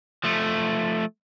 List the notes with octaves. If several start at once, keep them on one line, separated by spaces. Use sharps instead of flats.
F3 A3